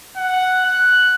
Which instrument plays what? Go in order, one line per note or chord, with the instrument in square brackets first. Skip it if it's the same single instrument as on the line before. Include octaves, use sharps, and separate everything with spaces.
[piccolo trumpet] F#5
F#6